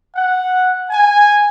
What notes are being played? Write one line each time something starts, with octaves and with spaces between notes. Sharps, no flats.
F#5
G#5